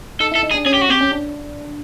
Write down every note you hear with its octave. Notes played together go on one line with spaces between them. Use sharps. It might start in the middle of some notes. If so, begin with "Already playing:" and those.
D#4 A4
E4
A4
D#4
G#4
D4
C#4 G#4
G4
C#4
F#4
C4 G4
C#4
D4